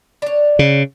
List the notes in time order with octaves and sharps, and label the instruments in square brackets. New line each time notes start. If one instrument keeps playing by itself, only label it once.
[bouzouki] D4 C#5
[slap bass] C#3